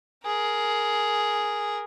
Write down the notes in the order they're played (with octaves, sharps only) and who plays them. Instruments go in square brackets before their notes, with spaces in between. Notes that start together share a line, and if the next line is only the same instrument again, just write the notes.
[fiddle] G#4 A#4